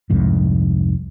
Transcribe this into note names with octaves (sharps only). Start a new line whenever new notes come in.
C2 F2 G#2